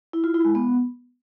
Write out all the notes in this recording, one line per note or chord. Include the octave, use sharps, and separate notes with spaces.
E4
F4
E4
G#3
B3